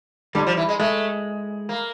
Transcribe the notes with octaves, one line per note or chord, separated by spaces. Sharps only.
D3 G3
F3
E3
G#3
G#3 A3
A#3